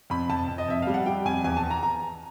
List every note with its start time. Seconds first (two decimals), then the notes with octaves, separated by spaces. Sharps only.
0.10 F2 B5
0.30 F2 A5
0.48 F2
0.58 D#5
0.68 F2 E5
0.82 G3 F5
0.94 F#5
1.06 G3 G5
1.25 F2 G#5
1.44 E2 G#5
1.57 A5
1.63 E2
1.70 A#5
1.83 A#5